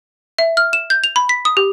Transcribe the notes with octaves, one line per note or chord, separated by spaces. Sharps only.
E5
F6
E7
G6
F7
B5
B6
D#6
G4